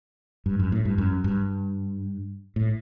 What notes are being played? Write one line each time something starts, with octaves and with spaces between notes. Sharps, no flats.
G2
F#2
A2
G2
F#2
G2
A2